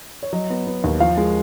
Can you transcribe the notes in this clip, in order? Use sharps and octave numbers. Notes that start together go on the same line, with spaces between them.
C#5
F#3 D#5
B3
B3
D#2
F3 F5
G#3